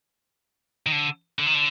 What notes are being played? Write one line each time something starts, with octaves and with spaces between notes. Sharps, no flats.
D#3
D3
D3
D#3
D3